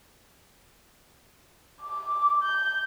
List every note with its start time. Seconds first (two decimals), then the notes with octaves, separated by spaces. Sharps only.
1.82 D6
2.43 G6